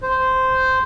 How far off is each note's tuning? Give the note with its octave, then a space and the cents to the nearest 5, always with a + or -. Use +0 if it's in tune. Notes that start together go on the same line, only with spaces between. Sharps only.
C5 -10